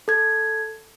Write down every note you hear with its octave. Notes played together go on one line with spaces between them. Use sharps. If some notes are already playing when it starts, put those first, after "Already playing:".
A4 G#6